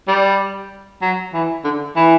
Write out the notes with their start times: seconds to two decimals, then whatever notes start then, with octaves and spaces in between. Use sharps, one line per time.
0.08 G3
1.02 F#3
1.33 E3
1.65 D3
1.96 E3